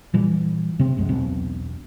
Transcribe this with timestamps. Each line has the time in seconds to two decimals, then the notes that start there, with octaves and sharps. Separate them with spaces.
0.14 A#2 E3 G3
0.79 C3 C4
0.97 B1 F#2 G#3
1.09 E1 B1 B2 C4